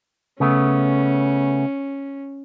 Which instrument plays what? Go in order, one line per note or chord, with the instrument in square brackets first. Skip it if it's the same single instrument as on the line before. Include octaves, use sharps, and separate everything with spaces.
[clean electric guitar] C#3 A3 B3 [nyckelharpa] C#4